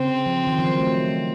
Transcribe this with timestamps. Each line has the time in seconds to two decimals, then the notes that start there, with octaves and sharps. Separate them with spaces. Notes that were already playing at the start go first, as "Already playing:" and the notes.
Already playing: C#3 C4
0.26 F3
0.47 D#3
0.59 F3
0.69 F#3
0.80 A3